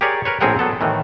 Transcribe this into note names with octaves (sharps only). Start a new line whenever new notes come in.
G4 G#4 A#4 C#5 D5
A#4 B4 C#5
A#1 A2 C4 G#4 A#4 F#5
F#3 B3 A4
A2 D#3 E3